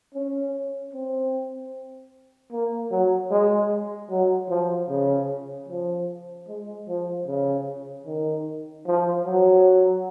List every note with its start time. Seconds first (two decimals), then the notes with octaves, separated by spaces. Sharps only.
0.14 C#4
0.93 C4
2.52 A#3
2.91 F#3
3.31 G#3
4.10 F#3
4.50 F3
4.89 C#3
5.69 F3
6.48 G#3
6.88 F3
7.27 C#3
8.07 D#3
8.87 F3
9.26 F#3